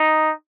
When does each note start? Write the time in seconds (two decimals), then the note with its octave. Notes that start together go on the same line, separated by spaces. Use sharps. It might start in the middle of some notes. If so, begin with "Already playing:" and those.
Already playing: D#4